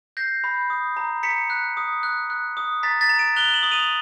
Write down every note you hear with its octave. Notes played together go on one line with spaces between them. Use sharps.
G6 A#6 C7
B5
D#6
A#5
A#5 B6 C#7
F#6
D#6
F#6
F#6
D#6
A#5 A6 B6
A6 B6
A#5
D7 E7
F#6 F7 G7
E7 F#7
D#6
D#7 F7